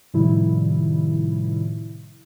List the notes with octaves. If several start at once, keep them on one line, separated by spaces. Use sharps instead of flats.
A2 C3 D#3 F3 G3 E4